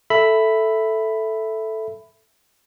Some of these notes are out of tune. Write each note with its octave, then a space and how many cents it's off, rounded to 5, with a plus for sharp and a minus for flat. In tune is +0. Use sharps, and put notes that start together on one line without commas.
A4 +0 E5 +0 B5 +5